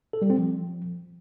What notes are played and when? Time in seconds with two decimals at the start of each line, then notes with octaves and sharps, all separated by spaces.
0.13 A4
0.22 G3
0.30 C4
0.38 F3